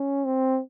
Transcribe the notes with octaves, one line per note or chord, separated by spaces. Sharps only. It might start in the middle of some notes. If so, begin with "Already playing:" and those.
Already playing: C#4
C4